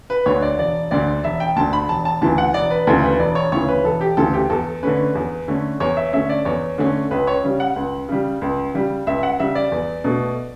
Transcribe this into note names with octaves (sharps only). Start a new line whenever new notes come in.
B4
D2 D3 C#5
D5
E1 D5
D2 D3 D5
E1 E5
G5
D2 D3 A5
B5
E1 A5
A5
D2 C#3 E3 A5
F#5
E1 D5
B4
D2 C#3 E3 A4
B4
E1 D5
C#5
D2 C#3 E3 C#5
B4
E1 A4
G4
D2 C#3 E3 A4
G4
E2 A4
D3 A3 C#4 B4
E2
D3 A3 C#4
E2 C#5
E5
D3 A3 C#4 E5
D5
E2 C#5
D3 A3 C#4
C#2 B4
C#5
C#3 G3
F#5
C#2
C#3 G3
C#2
C#3 G3
C#2 E5
F#5
C#3 G3 E5
D5
E2
B2 A3